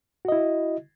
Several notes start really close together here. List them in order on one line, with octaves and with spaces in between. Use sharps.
F#4 D#5 E4